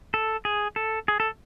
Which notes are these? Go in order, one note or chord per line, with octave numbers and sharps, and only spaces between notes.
A4
G#4
A4
G#4
A4